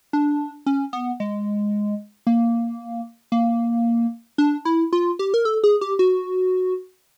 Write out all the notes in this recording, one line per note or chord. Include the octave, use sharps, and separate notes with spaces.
D4
C#4
B3
G#3
A#3
A#3
D4
E4
F4
G4
A#4
A4
G#4
G4
F#4